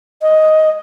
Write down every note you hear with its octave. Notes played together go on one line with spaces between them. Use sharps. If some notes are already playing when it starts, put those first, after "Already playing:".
D#5